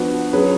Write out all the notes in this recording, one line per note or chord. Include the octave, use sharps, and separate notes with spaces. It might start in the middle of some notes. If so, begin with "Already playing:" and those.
Already playing: F3 B3 D4 F#4
F#3 C#4 G#4 B4